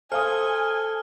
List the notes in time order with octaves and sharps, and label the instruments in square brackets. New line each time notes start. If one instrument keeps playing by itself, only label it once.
[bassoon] A4 [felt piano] C5 F5 D#6 [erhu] G#5 [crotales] F6